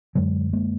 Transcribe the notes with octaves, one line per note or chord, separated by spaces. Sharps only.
F#2 D3 F#3 G#3
G#3 A#3